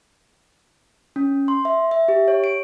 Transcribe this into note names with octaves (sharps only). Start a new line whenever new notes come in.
C#4
C6
E5
E5
G4
C#5
D7